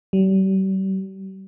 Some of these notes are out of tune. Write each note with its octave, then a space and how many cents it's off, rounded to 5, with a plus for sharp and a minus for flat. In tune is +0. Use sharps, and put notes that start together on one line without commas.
G3 -40